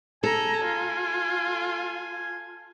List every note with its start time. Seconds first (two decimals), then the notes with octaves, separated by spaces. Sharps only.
0.24 A4 G#5 A#5
0.65 F4